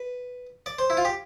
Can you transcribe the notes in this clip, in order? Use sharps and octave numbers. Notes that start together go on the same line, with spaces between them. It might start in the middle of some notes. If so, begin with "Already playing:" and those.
Already playing: B4
D5
C5
E4
F4
G4